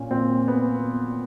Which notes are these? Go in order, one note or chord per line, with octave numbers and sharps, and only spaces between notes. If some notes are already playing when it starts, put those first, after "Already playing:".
Already playing: A#2 C#4
A#2 C4
B3